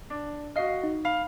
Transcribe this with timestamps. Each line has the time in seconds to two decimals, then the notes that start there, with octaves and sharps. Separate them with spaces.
0.10 D4
0.56 F#4 D#5 F5 C7
0.84 D#4
1.05 F5 B5